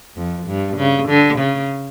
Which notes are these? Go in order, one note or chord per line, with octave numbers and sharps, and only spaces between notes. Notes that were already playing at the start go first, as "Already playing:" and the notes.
F2
G2
C#3
D3
C#3